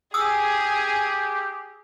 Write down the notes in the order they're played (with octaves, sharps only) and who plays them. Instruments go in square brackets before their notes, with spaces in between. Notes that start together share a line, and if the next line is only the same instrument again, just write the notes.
[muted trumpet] G4 [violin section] G#4 [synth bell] D#6 E6